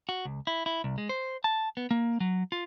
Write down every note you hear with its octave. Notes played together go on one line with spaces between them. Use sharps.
F#4
C#2
E4
E4
C2
G#3
C5
A5
B3
A#3
F#3
F4